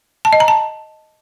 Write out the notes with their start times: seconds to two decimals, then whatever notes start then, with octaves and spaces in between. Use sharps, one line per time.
0.25 A5
0.33 D#5
0.40 A#5
0.48 A5